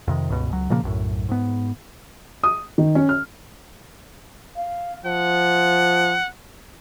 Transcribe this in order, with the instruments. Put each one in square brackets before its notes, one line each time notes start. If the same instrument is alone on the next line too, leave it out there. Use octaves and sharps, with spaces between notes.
[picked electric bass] F2 C3 D#3
C#2 G2 B2
C#2 F#3
A#2 C#3 F3 A#3
B1 F#2 A2
G#2 B3
[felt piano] D#6
D#3
C#4
F6
[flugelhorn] F5
[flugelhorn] F3 [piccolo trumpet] F#5